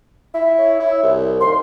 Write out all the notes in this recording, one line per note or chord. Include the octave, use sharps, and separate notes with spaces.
E4 E5
C#5
E4
C2
D#2 C6